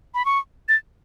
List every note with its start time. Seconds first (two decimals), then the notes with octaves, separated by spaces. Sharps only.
0.14 B5
0.25 C#6
0.69 A6